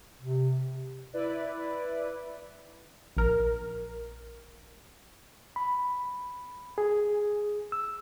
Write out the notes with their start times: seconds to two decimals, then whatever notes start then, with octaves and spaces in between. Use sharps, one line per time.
0.22 C3
1.13 E4 B4 D5
3.17 A#1 A#4
5.56 B5
6.78 G#4
7.72 E6